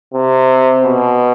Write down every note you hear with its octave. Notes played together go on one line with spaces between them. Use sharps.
C3
B2